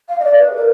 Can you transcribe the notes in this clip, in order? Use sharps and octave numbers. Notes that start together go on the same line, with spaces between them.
F5
D#5
D5
B4
G#4
A#4